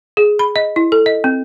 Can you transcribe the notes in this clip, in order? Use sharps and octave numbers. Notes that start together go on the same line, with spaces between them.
G#4
B5
D#5
E4
A4
D#5
C4